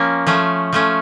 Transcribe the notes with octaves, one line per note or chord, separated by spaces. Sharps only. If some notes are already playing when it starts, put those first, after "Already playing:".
Already playing: F3 A#3 C#4
F3 A3 C#4
F3 A3 C#4